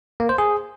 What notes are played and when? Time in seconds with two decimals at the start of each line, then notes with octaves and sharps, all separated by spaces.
0.20 A#3
0.29 C5
0.38 G#4